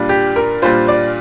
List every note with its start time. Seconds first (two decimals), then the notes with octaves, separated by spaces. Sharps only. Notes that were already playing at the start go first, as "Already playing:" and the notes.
Already playing: A#2 G3 D4 F4
0.09 G4
0.36 A#4
0.62 A#2 G3 D4 F4 C5
0.88 D5